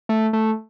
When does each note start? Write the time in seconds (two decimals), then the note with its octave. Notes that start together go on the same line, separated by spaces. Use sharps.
0.09 A3
0.33 A3